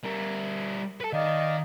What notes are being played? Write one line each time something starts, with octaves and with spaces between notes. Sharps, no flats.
G3 A#4
A4 B4
D#3 D5 D#5 F5